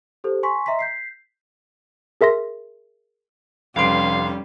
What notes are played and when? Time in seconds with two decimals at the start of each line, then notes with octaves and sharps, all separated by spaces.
0.24 G4 A4 C5
0.43 G#5 C6 C#6 B6
0.66 D#5 E5 A#5 C6 B6
0.79 G6 B6 C7
2.21 G#4 A#4 E5 C6 A#6
3.76 F1 G3 C#4 B4 F5 C6 C7 D7